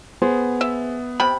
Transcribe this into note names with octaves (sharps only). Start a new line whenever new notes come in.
B3 G#4 C5
E5
C3 G5 B5